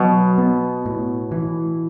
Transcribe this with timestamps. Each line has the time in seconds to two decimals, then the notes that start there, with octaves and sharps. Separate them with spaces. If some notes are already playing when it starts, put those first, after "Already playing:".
Already playing: B2 F#3
0.38 B3
0.86 A2
1.32 E3